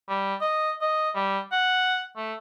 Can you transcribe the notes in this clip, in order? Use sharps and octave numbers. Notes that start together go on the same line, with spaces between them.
G3
D#5
D#5
G3
F#5
A3